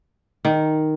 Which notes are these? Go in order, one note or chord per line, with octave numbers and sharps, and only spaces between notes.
D#3